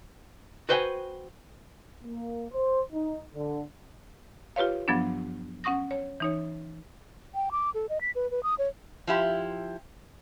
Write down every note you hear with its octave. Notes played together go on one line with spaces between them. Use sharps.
F#4 B4 C5 D#5 G5 G#5
A#3
C5
D#4
D3
F4 G4 B4 C#5 F5
G2 F3 F#3 B3 D4
C#4 F#5 C#6 D#6 A#6
C#5
E3 D#4 C#5
G5
D6
A4
D#5
B6
B4
B4
D#6
C#5
F3 E4 G4